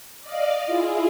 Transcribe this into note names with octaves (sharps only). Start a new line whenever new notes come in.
D5 D#5 F5
E4 F4 G#4